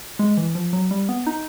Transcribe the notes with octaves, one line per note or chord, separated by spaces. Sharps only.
G#3
E3
F3
F#3
G3
B3
D#4